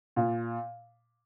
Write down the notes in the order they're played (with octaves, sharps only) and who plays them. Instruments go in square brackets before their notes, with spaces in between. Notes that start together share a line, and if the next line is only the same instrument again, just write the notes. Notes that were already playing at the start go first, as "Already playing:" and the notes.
[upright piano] A#2